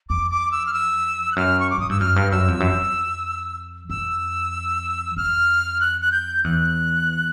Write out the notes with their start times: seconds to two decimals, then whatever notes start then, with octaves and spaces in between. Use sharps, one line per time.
0.09 F2 D6
0.31 D6
0.52 E6
0.66 F6
0.74 E6
1.32 F#6
1.36 F#2 F6
1.60 C#6
1.70 D6
1.78 G#2 D#6
1.89 G2 E6
2.00 F#2 F6
2.16 G2
2.32 F#2 E6
2.48 F2
2.60 F#2
2.72 F2
3.90 F2 E6
5.16 F2 F6
5.81 F#6
6.01 F#6
6.12 G6
6.44 E2 F#6